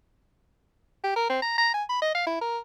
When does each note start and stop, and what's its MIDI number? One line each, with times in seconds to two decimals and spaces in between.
1.04 1.16 67
1.16 1.28 70
1.30 1.42 60
1.43 1.55 82
1.58 1.70 82
1.74 1.84 80
1.90 2.02 83
2.02 2.13 75
2.15 2.24 77
2.27 2.38 64
2.42 2.59 70